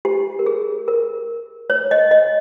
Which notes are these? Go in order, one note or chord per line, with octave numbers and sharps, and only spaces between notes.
G4
A#4
G#4
A#4
C#5
D#5
D#5